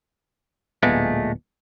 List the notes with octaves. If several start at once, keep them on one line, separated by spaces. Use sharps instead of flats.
D1 A#2 G#3 A3 B3